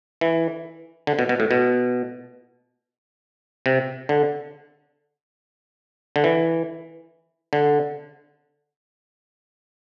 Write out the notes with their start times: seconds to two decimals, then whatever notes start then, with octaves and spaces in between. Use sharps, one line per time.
0.21 E3
1.07 D3
1.19 B2
1.29 B2
1.40 A2
1.51 B2
3.66 C3
4.09 D3
6.16 D3
6.24 E3
7.53 D3